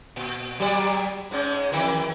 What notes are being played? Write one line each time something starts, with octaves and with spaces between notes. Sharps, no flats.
A#2
F#3 G3 D5
G#2 G#3 C#4
F2 D#3 E3